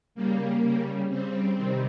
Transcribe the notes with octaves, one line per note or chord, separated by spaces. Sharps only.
C#3 G3 A#3
C#3 G3
C#3 G3 C4
C3 D#3 G3